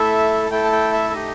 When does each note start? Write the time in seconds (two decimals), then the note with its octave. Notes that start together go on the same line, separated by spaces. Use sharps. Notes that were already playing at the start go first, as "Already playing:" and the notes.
Already playing: A3 E4 A4 E5
0.50 A3 E4 A4 G5
0.64 A5
0.72 G5
0.93 E5
1.10 E5
1.13 A3 D#4 G4 D#5